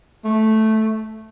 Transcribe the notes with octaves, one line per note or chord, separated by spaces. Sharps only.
A3